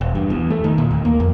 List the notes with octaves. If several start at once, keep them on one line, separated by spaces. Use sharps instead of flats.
E1
G2
E2
A3
D#3
A#2
D#2
A#3
F2